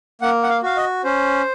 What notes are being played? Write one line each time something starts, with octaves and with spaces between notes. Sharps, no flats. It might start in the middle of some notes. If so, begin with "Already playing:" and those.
A#3 F#5
F#5
F5
F#4 F5
D#5
C#4 C5